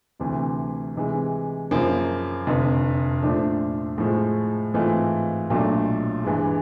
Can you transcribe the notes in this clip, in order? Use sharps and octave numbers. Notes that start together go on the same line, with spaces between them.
D2 C3 E3
C3 E3 G#3
F#2 C#3 F3 A#3
F1 F2 D3
A#2 F3 A3 D4
A2 F3 G#3
G#2 E3 A3 C4 F4
B1 A#2 F#3 A3 D4
G2 E3 G#3